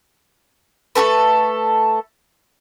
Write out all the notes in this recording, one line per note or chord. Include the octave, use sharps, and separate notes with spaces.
A3 F#4 A4 B4